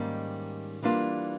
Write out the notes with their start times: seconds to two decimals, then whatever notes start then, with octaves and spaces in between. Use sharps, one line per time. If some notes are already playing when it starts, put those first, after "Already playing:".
Already playing: G#2 D#3 G3 A#3 C#4
0.83 E3 G3 A#3 D4 F4